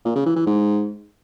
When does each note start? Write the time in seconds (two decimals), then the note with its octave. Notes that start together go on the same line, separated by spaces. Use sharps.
0.05 A#2
0.15 C#3
0.26 E3
0.36 E3
0.46 G#2